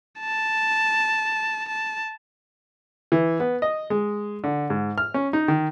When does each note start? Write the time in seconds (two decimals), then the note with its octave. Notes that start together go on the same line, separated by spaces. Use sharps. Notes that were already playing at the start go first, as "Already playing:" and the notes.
0.20 A5
1.68 A5
3.12 E3
3.40 B3
3.62 D#5
3.90 G#3
4.44 D3
4.70 G#2
4.98 F6
5.14 C#4
5.33 D#4
5.48 D#3